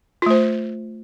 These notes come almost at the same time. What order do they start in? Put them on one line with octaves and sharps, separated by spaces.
F4 A3 C5